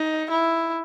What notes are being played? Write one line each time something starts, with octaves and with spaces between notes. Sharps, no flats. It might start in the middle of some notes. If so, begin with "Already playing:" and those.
Already playing: D#4
E4